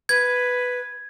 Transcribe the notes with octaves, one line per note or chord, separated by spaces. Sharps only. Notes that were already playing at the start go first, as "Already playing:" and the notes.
B4 G#6